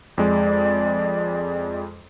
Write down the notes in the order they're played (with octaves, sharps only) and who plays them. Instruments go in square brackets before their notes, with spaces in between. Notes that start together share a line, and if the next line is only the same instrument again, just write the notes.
[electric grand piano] F2 G#3 [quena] D5